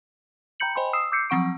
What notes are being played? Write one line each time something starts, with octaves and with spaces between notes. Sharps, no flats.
G5 A#5 B5 G6 C#7 F#7
C5 D#5 G5 G#5 B5 C6
D#6 E6 C7 E7
D6 E6 G6 C7 C#7
F3 F#3 C4 F#5 C#6 D7